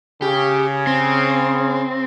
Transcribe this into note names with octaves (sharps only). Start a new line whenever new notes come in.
C#3 G4
C4